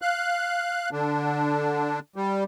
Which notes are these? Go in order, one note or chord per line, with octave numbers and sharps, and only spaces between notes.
F5 F#6
D3 D4
G3